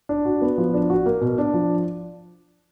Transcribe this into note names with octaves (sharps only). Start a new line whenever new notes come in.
D4
F#4
B3
F3
D4
F#4
A#3
B2
D4
F3